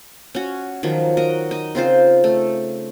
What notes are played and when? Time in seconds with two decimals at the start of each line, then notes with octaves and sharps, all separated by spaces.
0.35 C#4 F#4
0.83 D#3 F3 F#3
1.17 F#4 A#4 D#5
1.51 D#4 D#5
1.75 C#3 C4 F4 C5
2.24 A3